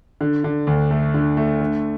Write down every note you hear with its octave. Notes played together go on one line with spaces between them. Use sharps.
D3
D3
D2
A3
D3
A3
D3